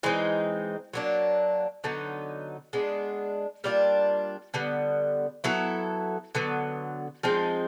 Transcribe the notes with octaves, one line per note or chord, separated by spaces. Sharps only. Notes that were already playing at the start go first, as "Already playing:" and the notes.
E3 G#3 C4 D#4
F#3 A#3 D4
D3 F#3 B3 D#4
G#3 B3 D4
G3 A#3 D4 F4
D3 G3 B3
F#3 B3 E4 A4
D3 F#3 B3
F3 G#3 C4 D#4